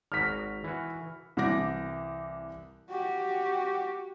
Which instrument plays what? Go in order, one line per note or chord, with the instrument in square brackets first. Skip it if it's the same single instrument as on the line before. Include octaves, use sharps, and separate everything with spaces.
[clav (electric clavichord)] G#1 F#4 A#5 [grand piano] F6 B6
[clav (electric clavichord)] E3 F#4
[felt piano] C2 E3 D6 A#6
[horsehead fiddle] F#4 G4